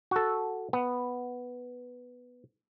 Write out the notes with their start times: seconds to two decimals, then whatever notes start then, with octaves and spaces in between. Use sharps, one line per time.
0.11 F#4 A4
0.73 B3